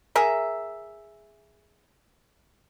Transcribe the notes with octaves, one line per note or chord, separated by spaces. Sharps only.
G#4 A#4 E5